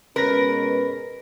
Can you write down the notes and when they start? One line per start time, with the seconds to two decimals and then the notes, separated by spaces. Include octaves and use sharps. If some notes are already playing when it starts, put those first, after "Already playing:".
0.16 B2 G#3 C#4 A#4 B4 B5 A#6